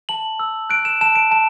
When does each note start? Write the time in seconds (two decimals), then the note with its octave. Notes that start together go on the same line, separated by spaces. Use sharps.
0.09 A5 F#7
0.39 E6
0.70 F#6 D7
0.85 E7
1.01 A5 E7
1.15 D7
1.31 A5 E7